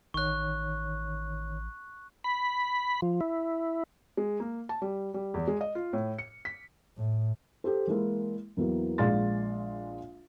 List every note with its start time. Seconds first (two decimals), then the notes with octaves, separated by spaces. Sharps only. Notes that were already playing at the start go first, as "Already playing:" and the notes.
0.14 A1 D#3 C#5 C#6 F#6
2.24 B5
3.02 F3
3.21 E4
4.17 G#3
4.40 A#3
4.69 A5
4.82 G3
5.14 G3
5.34 E2
5.48 G#3
5.61 D#5
5.75 F4
5.93 A2
6.18 C#7
6.45 B6
6.97 A2
7.64 G4 A4 C5
7.87 E3 G#3 A#3 E4
8.57 E2 E3 F#3 A#3
8.98 A#1 G#3 D5 F5 C6 A6